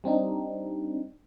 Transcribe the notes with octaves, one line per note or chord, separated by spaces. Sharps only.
G3 C4 D4 D#4